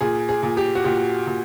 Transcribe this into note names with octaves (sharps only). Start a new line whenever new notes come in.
A#2 G#4
G#4
A#2
G4
F#4
A#2 G4
A#2